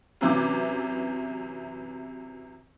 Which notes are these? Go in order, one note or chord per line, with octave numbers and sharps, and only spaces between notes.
F#2 C3 E3 B3 D6